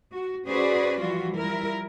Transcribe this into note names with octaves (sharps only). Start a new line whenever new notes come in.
F#4
C#4 F#4 G#4 B4 C5 D5
E3 F3 G3 F4 F#4
F3 G3 E4 A#4